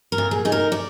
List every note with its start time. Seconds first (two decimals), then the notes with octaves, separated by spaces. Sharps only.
0.12 A#4
0.18 A#2
0.31 G#4
0.45 D#4 G#4
0.52 A#4
0.72 D5